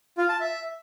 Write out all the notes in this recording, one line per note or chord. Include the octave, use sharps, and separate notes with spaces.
F4
A5
E5